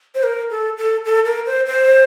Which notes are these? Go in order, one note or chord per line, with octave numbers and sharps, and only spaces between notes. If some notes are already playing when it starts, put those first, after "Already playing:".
C5
A#4
A4
A4
A4
A#4
C5
C5